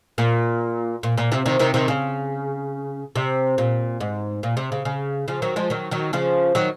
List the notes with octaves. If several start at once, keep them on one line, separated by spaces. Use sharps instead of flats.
A#2
A#2
A#2
C3
C3 D#3
C3 D#3
C3 D#3
C#3
C3
A#2
G#2
A#2
C3
C#3
C#3
C#3 F3
D#3 F#3
F3 G#3
D#3 F#3
D#3 F#3
C#3 F3
D#3 F#3